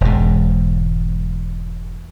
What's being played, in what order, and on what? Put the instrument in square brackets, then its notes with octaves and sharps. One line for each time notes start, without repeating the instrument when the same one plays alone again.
[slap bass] E1 G#2